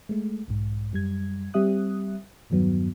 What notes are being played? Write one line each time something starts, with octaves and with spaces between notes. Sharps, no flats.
G#3 A3
B1 G#2
F#2 G3 G#6
G3 C4 G4 E5 D#6 F#6
E2 G2 D#3 F#3 B3